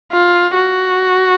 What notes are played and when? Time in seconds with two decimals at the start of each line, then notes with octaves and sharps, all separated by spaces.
0.12 F4
0.55 F#4